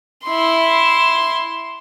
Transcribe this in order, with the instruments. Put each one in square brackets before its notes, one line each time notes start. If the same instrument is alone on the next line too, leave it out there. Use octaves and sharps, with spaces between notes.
[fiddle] E4 C6